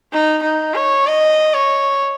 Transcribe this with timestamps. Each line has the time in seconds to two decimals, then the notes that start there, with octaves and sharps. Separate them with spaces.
0.13 D#4
0.43 D#4
0.75 C#5
1.07 D#5
1.54 C#5